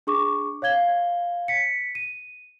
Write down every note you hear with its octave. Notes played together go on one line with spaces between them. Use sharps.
D4 G#4 C#6 D6
C#5 F5 G#6 G7
B6 C#7
D#7